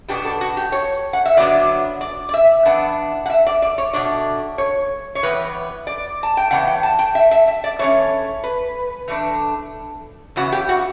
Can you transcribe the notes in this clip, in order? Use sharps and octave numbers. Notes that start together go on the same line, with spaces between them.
B2 G3 B3 D4 G4
A4
F#4
G4
C#5
F#5
E5
D3 F#3 B3 D4 D5
D5
D5
E5
E3 B3 D4 F#5
F#5
E5
D5
D5
C#5
B2 A3 D4 D5
C#5
C#5
E3 G3 B3 B4
D5
A5
G5
C#3 E3 B3 F#5
G5
A5
G5
E5
E5
E5
D5
E3 A3 C#4 C#5
B4
E3 A3 D4
C#3 E3 B3 F#4
G4
F#4